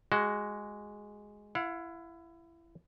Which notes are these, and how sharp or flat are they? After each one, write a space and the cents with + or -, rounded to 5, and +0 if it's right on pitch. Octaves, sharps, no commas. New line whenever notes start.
G#3 +0 F#4 +15
E4 +25 F#5 -45